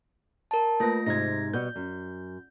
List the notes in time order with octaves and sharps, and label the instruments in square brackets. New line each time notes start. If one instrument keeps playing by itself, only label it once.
[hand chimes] A#4 A5
[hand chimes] A3 F4 A#6 [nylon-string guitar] A#3 B4
[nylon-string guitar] G#2 C3 D#4 [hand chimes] G#6 A#6
[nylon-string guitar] B2 G3 F#5 [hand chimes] G6
[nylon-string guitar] F#2